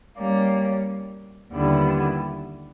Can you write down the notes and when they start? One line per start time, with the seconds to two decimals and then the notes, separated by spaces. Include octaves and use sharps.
0.18 G3 A#3 C#4
1.53 D#2 D3 G3 B3 E4